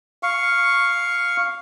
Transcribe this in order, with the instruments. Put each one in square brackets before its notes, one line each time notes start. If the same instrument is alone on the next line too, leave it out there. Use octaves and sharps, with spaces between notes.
[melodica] F5 C#6